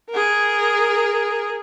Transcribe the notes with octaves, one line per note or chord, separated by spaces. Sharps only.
G#4 A#4